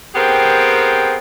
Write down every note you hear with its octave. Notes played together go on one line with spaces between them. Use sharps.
B3 C4 G4 G#4 A#4